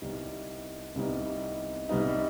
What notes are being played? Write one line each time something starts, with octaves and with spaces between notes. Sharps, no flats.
C2 C3 G3 B3 D#4
C2 C3 G3 B3 D#4
C2 C3 G3 B3 D#4